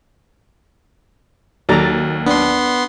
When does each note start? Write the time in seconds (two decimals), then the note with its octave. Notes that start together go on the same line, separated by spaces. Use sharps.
1.69 D#2 F#3 A4 D5 A#5 A6
2.27 B3 D4 C6